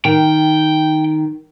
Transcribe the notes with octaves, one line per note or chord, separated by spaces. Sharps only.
D#3 G5